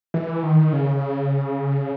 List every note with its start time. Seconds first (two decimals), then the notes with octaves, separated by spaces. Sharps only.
0.14 E3
0.43 D#3
0.73 C#3